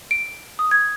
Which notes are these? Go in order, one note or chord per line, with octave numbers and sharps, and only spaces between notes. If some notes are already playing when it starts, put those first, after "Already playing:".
D7
D#6
G#6